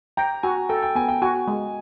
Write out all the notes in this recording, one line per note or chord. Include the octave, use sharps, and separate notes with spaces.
G5 A#5
F#4 G#5
A4 G5
G5
B3 G#5
G5
F#4 G#5
G#3